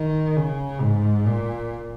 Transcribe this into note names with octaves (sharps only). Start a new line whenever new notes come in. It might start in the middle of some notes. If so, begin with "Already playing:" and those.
Already playing: D#3
C#3
G#2
A#2